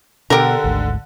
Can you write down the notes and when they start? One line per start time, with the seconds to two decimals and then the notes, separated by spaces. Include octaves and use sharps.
0.30 B2 D3 G4 A#4
0.64 G#1 D2 G#2